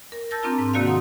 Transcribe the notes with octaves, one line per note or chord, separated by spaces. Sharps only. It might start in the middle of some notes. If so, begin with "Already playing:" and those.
A#4
A5 E6 G6 A6 A#6
C4 D4 F4 A#5
G#2
C3 D#3 A#3 F#4 D5 F5
F#5 C6 D#6